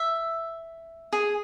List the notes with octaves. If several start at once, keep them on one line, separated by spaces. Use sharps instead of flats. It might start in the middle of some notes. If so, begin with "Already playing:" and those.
Already playing: E5
G#4